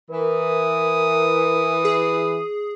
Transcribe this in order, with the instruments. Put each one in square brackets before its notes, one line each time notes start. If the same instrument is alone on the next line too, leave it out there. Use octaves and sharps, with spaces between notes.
[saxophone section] E3 [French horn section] A#4 [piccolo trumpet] D#6
[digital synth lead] G#4